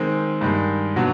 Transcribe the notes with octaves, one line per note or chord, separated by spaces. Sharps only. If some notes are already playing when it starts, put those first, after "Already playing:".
Already playing: D#3 G#3 C4
G2 D#3 G#3
B2 F#3 B3 D4 F#4